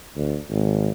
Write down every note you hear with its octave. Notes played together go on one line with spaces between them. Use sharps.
D2
G#1